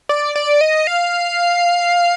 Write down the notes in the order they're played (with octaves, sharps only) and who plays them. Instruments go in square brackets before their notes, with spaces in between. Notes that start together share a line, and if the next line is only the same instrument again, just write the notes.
[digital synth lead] D5
D5
D#5
F5